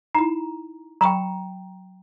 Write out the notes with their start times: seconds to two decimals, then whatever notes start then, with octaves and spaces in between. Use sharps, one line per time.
0.15 D#4 E4 A#5
1.01 F#3 G5 A#5 B5 C#6